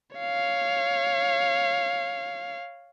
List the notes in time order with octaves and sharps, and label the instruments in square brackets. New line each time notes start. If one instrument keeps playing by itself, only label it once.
[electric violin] C#5 F5